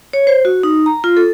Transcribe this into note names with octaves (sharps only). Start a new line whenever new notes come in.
C#5
C5
F#4
D#4
A#5
F4
A4